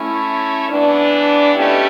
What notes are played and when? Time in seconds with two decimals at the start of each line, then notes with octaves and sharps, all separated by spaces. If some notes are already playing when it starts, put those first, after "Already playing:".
Already playing: A3 C#4 E4
0.68 E3 B3 D4
1.54 B2 A3 C#4 E4 G4